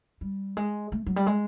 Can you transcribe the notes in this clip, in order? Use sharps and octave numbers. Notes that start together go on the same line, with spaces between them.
G3
G#3
A3
F#3
G3
G#3